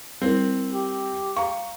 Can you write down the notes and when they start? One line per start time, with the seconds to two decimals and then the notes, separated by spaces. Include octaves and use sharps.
0.22 G3 C4 E4 A#4
0.73 G4
1.37 F5 A#5 C#6